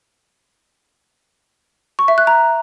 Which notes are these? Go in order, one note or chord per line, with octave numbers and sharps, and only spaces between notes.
C#6
E5
F#6
A#5